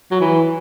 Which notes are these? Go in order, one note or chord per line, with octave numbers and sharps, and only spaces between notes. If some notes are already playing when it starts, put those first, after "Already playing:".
F#3
E3